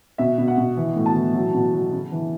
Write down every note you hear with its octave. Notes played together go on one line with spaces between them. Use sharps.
B2 E5
B2
F#5
B2
E3
A2
A5
E3
F#3
B2
F#3
C#3
E3